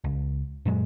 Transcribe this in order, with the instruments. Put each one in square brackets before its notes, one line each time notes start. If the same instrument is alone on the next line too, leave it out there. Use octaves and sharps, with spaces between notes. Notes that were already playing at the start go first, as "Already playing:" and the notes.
[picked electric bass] C#2
F#2 A#2 F#3 G#3